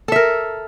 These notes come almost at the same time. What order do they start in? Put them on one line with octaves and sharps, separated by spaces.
A4 E5 A#4